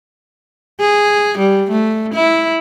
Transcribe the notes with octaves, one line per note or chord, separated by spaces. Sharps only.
G#4
G3
A3
E4